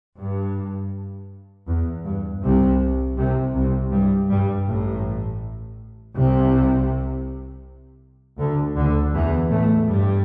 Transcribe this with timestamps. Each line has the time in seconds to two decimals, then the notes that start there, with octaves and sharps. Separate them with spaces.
0.19 G2
1.67 E2
2.05 G2
2.43 C2 C3
3.17 C2 C3
3.54 C2 C3
3.91 G2 G3
4.29 G2 G3
4.66 A1 A2
6.15 C2 C3
8.39 D2 D3
8.76 D2 D3
9.14 E2 E3
9.51 A2 A3
9.88 G2 G3